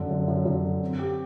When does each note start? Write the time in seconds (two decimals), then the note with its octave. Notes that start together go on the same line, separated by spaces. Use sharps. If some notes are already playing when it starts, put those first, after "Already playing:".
Already playing: F#2 D3
0.11 F#2
0.28 F#2
0.46 F#2
0.64 D3
0.81 C4
0.99 G4